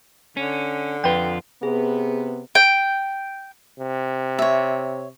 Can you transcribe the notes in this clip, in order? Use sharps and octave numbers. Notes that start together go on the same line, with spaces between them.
D3 C#4
F2 F4 B4 G5
C3 B3 G#4
G5
C3
C#5 E5